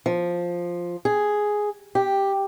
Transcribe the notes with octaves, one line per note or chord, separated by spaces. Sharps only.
F3
G#4
G4